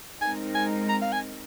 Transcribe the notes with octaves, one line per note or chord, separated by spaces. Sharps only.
G#3 C4 D#4 A#4 G#5
G#5
A#5
F5
G#5